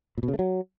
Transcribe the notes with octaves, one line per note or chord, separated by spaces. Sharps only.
A#2
B2
C#3
A3
F#3